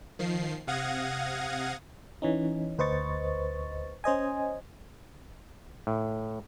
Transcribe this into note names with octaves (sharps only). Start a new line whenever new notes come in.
D#3 F3 C7
C3 F5 F#5 D#6 G#6 A#6
E3 C#4 D#4
D2 B4 C5 D#5 C#6 A6
C#4 C5 D#5 G#5
A2